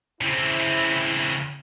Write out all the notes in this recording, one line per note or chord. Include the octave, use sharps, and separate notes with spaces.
C#3 C4 E4